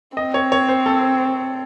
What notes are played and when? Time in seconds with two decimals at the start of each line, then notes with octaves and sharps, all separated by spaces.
0.17 C4 D#5
0.34 C#5
0.52 C#5
0.69 C5
0.86 A4